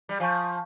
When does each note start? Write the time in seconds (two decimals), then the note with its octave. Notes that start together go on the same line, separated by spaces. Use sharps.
0.09 G3
0.20 F3 F5 G#5 C#6 G6